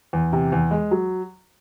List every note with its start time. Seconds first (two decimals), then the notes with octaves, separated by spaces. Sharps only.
0.13 E2
0.33 C3
0.52 E2
0.71 G#3
0.91 F#3